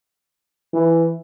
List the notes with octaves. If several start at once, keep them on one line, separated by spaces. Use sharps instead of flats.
E3